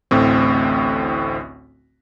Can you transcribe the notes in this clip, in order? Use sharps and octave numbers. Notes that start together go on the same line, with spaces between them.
A1 D2 A2 C4